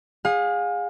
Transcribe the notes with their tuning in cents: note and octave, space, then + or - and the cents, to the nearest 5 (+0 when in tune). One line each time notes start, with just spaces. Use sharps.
G#4 -15 F5 +35